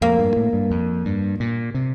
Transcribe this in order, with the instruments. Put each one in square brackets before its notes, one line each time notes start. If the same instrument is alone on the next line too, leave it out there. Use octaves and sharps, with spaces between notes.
[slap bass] F2 [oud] A#3
[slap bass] G2
A2
G2
F2
G2
A#2
C3